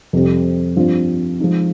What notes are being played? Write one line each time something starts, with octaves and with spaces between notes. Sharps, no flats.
F2 C3 G3 C4
G2 F3 C4 F4
F3 G#3 D#4